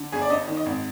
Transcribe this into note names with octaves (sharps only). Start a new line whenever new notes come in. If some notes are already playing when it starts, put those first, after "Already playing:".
Already playing: D3
G1 G#4
D5
G2 D#5
D#3
D#5
G#1